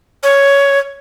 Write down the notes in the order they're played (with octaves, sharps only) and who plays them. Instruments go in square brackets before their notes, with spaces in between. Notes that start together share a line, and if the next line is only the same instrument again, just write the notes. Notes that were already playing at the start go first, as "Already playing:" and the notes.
[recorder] C#5